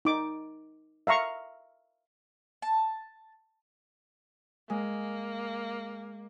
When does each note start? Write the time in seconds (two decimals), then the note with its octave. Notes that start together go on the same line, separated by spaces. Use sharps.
0.05 D#4 D6
1.07 E5 F5 A#5 C#6
2.62 A5
4.70 G#3 A#3